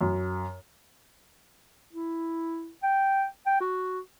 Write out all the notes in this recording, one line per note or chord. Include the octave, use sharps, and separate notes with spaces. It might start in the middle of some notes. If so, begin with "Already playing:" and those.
F#2
E4
G5
G5
F#4